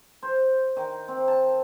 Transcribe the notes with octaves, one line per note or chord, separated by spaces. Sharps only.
C5
D#3
C4
A5